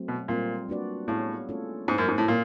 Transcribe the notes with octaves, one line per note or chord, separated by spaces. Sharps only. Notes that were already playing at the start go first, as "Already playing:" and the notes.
Already playing: F#3 A3 C4
B2
A#2 G3 C4 F4
A#3 D4 F#4 B4 D5
A2 B3 E4 G#4 C#5 F5
A3 C#4 F4 A4 C#5
G#2 A#3 C#4 E4
F#2
G#2
A2
A#2 A#3 C#4